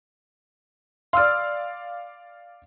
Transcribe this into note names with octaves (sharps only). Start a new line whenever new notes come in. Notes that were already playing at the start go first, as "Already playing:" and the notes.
D5 F5 C6 E6 F6